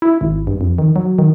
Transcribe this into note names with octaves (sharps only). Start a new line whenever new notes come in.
E4
G#1
G2
F2
D#3
F#3
D#3